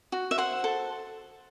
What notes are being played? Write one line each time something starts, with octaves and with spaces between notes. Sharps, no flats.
F#4
E5
C5 F#5
A4